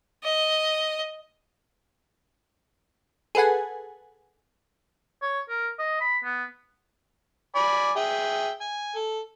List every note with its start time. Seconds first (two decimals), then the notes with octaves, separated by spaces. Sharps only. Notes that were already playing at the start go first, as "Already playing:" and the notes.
0.24 D#5
3.35 G#4 A4 B4 F#5 G#5
5.22 C#5
5.49 A#4
5.79 D#5
6.01 B5
6.24 B3
7.56 D5 G#5 B5
7.96 G#4 E5 G5
8.61 G#5
8.96 A4